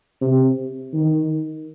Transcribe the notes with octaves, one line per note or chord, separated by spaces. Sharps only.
C3
D#3